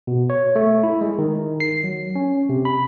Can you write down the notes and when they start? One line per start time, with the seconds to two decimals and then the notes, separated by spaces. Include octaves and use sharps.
0.07 B2
0.30 C#5
0.56 A3
0.83 E4
1.01 G#3
1.18 D#3
1.60 C7
1.84 F#3
2.15 C#4
2.49 C3
2.65 B5